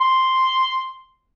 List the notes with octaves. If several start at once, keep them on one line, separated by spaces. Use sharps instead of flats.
C6